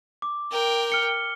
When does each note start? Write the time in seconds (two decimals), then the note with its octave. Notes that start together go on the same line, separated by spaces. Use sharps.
0.22 D6
0.51 A#4 G5
0.90 F6 C#7 G7